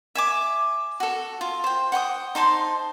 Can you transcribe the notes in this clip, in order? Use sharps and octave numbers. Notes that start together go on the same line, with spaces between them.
E5 G#5 D6
F#4 A4
F4
C5 G5
F#5 G5 C6 D#6
D#4 C5 A5 C6